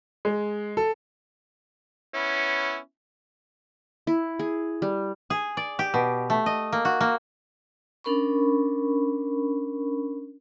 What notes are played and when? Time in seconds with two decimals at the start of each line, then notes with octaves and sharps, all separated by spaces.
0.25 G#3
0.77 A4
2.14 B3 C#4 E4
4.07 E4
4.39 G#4
4.82 G3
5.30 G#4
5.57 D5
5.79 G4
5.94 B2
6.30 A3
6.46 D#5
6.72 A#3
6.85 F#4
7.01 A#3
8.04 C#4 D4 A#4 B5 C#6